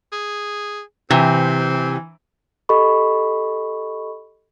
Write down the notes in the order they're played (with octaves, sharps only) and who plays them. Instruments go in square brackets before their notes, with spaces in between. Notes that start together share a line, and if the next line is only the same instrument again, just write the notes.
[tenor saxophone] G#4
[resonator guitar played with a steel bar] C3 [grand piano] E3 [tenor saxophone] C4
[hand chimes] G4 A4 D#5 B5 C#6